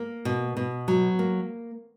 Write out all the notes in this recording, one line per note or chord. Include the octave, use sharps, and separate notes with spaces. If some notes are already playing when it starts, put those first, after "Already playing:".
Already playing: A#3
B2
B2
F#3
A#3